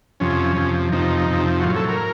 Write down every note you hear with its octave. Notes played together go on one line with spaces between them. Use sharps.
F2 C3 F3 C#4
F2 C3 F3
F2 C3 F3 D#4
F2 C3 F3
F#4
A2 F#3 F4
A4
A#4